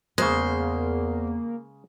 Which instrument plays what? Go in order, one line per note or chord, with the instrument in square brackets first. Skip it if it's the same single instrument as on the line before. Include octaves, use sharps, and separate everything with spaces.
[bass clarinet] E2 [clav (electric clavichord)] C#3 G#3 [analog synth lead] A#3 [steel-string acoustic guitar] C5